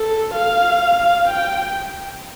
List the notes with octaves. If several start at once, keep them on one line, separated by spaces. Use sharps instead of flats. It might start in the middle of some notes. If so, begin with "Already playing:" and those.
Already playing: A4
F5
G5